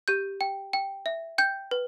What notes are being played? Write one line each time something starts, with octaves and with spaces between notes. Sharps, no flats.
G4 G6
G5
G5
E5
G5 G6
B4